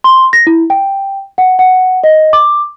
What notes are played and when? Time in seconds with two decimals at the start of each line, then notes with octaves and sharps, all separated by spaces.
0.04 C6
0.33 A#6
0.47 E4
0.70 G5
1.38 F#5
1.59 F#5
2.04 D#5
2.33 D6